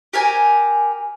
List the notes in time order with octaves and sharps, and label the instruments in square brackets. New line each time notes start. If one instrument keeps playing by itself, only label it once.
[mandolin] G4 A#4 G#5